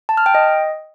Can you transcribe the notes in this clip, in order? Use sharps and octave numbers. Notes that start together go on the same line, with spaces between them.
A5
F6
G5
D#5